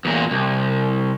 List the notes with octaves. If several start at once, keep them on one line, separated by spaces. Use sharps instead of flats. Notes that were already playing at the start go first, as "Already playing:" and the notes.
E2 A#2
C2